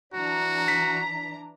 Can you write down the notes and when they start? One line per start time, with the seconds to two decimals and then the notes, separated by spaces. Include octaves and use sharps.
0.14 E3 D4 F#4 A#5
0.68 B6